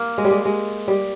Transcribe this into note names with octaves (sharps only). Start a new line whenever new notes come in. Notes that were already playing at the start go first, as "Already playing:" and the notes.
Already playing: A#3
G#3
G3
G#3
G#3
G3